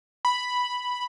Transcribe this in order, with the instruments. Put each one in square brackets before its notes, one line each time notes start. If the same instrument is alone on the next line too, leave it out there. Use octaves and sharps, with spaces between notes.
[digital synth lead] B5